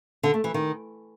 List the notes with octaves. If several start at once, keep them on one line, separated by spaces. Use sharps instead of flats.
D3
A3
E3
D#3